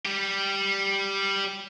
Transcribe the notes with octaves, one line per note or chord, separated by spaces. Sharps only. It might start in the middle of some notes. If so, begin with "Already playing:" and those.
G3 G4